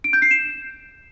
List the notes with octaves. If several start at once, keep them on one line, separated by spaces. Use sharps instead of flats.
D7
G6
C7
E7